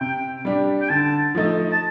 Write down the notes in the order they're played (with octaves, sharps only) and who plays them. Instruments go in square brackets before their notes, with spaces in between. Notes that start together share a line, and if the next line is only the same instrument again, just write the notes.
[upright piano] C3 [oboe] G5
[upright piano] G3 D4 G4
[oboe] G5
[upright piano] D3 [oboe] A5
[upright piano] F3 A3 D#4
[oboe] A5